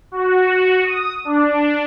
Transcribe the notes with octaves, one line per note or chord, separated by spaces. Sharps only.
F#4
D#6
D4